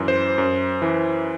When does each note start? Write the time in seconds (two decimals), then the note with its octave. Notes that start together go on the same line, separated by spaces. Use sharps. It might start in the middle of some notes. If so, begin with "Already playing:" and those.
Already playing: F#2 E3
0.08 C5
0.38 F#2
0.82 E3